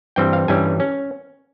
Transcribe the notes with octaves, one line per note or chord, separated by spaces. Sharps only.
G2 E3 G3 C4 G5
F5
G2 E3 G3 C#4 G#5
C#4